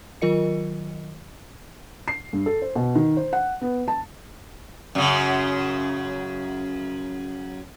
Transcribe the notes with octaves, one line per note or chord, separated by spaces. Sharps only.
D#3 F#3 F4 A#4 D#5 C#7
C7
G2
A4
C5
B2
D#3
C5
F#5
B3
A5
F#2 C#3